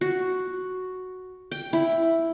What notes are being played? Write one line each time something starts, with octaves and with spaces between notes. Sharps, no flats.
F#4
G5
E4